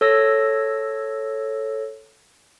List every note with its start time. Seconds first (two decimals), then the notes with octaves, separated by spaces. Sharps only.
0.01 A4 C#5 E6 A#6